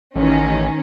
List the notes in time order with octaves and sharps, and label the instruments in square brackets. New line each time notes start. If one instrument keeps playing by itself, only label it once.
[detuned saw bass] A1 [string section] D#3 C#4